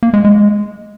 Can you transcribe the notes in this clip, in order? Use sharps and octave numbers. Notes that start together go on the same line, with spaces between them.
A#3
G#3
G#3